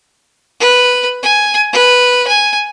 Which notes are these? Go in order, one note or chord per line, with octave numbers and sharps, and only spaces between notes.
B4
G#5
B4
G#5